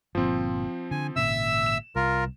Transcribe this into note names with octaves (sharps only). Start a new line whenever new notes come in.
G1 A#2 F3 C4
D3 G#5
G#1 A#2 C#3 E5 E6
E7
C2 F4 A#4